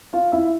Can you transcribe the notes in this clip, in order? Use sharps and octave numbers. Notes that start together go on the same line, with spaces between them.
F4 F5
E4 E5